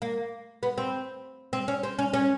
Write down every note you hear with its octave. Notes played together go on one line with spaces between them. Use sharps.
A#3
B3
C4
C4
C#4
C4
C#4
C#4